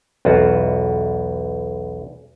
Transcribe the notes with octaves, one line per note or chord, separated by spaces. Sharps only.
B1 E2 F4 F#4